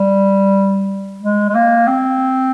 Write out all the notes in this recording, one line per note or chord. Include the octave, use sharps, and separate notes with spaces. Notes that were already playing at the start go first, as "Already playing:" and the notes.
Already playing: G3
G#3
G#3
A#3
C4